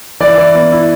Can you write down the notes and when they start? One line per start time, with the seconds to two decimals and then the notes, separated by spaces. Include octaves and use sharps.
0.20 E3 D5
0.38 E3
0.55 B3
0.72 E4